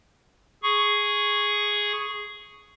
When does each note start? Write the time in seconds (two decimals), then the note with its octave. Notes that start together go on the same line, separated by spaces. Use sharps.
0.63 G#4 C#6